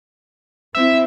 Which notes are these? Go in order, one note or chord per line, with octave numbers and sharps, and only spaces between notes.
C4 E4 E5